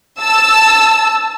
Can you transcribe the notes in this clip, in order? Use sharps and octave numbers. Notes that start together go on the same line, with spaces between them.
A5 E6